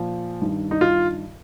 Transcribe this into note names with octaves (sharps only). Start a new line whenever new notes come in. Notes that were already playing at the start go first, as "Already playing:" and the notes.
Already playing: A#2 F3
G2 D#3
D#4
F4